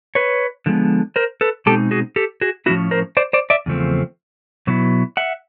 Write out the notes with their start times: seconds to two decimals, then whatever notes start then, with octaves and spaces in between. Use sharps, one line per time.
0.15 B4 C#5
0.66 D3 F3 G#3 B3
1.16 A#4 C5
1.41 A4 B4
1.66 B2 G#3 C4 D#4 G4 A4
1.91 F#4 G#4
2.16 G4 A4
2.41 F#4 G#4
2.66 A2 F3 A#3 C#4 E4 F#4
2.91 A#4 C5
3.17 C5 D5
3.33 C5 D5
3.50 D5 E5
3.66 E2 C#3 F3 A3 C4
4.67 B2 F#3 B3 E4
5.17 E5 F#5